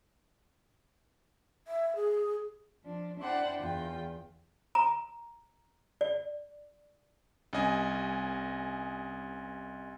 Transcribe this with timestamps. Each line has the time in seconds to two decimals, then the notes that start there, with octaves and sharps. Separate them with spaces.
1.68 E5
1.96 G#4
2.84 F3 D4
3.19 D4 E4 C5 D5 F#5 G5
3.60 E2 F4 G5
4.75 A#5
6.01 D5
7.53 C2 C#4 D#5 G#5